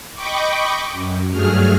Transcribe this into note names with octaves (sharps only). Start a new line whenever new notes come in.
D#5 G5 B5 C#6 D6
F#2
G2 F#3 A3 G#4 F6